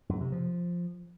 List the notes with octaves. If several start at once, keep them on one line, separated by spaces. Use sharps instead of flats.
F#2
C3
F3